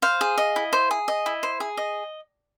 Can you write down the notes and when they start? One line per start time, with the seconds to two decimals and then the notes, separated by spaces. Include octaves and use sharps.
0.02 C5 F5
0.21 G#4
0.38 D#5
0.56 E4
0.73 C5
0.91 G#4
1.08 D#5
1.26 E4
1.43 C5
1.60 G#4
1.77 D#5